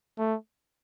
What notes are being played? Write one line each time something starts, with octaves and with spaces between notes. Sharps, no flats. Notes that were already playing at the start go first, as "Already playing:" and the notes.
A3